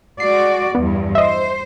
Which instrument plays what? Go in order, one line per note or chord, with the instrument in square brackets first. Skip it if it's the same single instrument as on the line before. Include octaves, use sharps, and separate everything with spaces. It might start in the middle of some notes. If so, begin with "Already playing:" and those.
[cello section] G#3 F#4 D5 [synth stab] C7
[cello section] E2 G2 [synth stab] B3
[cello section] C5 [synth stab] D#5 E5